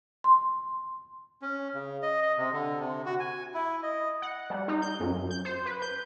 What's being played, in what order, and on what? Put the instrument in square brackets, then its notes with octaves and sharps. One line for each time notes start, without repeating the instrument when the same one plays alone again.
[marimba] C6
[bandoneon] C#4
C#3
D#5
D#5
C3
D3
C3
F#4
G#5
E4
D#5
[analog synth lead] F#5
G3
D#4
G6
F#2
G6
C5
B4
G6